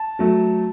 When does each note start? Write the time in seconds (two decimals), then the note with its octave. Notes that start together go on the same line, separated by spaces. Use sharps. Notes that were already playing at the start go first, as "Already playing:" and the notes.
Already playing: A5
0.19 F#3 A3